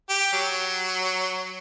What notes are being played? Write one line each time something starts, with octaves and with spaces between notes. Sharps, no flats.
G4
F#3